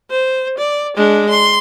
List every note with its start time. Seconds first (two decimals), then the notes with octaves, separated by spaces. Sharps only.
0.10 C5
0.58 D5
0.96 G#3 D4
1.29 C6